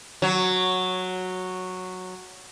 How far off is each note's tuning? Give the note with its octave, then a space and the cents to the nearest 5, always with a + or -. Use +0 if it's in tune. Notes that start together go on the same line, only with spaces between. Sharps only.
F#3 -5